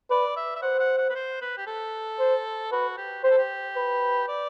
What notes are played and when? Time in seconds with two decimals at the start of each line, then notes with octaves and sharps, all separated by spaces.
0.10 B4 D5
0.36 E5
0.56 E5
0.62 C5 F#5
0.79 F#5
0.98 F#5
1.10 B4
1.15 C5
1.41 B4
1.57 G4
1.67 A4
2.19 C5
2.72 F#4 B4
2.97 G4
3.24 G4 C5
3.31 A4
3.38 G4
3.76 B4
4.28 D5